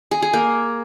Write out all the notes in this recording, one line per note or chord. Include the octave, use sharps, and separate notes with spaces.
G#4
G#4
A#3